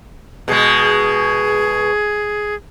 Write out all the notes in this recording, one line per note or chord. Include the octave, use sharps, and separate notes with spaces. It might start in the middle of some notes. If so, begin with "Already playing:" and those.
B2 G#3 G#4